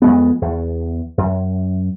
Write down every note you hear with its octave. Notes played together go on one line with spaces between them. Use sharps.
F2 G#3 B3
E2
F#2